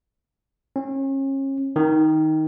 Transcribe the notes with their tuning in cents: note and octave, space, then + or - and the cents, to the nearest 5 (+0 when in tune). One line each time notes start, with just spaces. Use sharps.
C#4 -35
D#3 +10